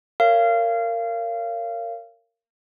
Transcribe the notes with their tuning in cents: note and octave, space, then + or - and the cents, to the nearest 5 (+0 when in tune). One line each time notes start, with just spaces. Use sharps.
A#4 -20 C#5 +0 F5 -25